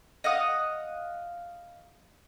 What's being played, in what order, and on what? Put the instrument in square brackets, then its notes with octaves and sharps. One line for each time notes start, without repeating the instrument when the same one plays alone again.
[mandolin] D#5 F5 F#5 D#6